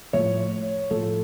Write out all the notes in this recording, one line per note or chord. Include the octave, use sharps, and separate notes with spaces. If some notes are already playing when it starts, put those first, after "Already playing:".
A2 F3 C#5
A2 F3 A4